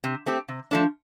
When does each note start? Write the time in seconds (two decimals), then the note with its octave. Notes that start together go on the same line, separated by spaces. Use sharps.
0.04 C3
0.26 A3 C4 G4
0.48 C3
0.71 F3 A3 D4